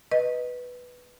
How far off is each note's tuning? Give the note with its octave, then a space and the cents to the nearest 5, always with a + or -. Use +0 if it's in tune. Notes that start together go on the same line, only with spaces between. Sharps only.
B4 +0 D#5 +0